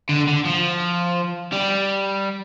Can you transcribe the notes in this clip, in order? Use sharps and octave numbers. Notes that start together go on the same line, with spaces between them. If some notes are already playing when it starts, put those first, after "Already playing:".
D3
D3
F3
G3